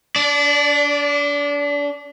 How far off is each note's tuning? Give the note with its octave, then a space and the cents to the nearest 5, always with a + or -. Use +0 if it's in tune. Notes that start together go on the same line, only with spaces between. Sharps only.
D4 -30 D5 +0